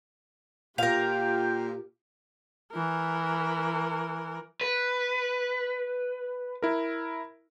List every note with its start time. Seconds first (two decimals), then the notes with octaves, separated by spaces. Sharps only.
0.78 A#2 F4 G4 A#4 F5 G5
2.72 E3 A#4
4.61 B4
6.62 E4 A#4